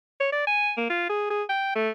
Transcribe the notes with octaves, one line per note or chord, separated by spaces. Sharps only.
C#5
D5
G#5
A#3
F4
G#4
G#4
G5
A3